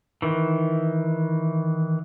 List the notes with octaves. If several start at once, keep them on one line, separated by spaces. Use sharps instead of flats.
D#3 E3